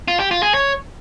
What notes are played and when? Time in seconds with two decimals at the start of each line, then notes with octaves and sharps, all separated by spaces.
0.08 F4
0.20 G4
0.31 F4
0.43 G#4
0.54 C#5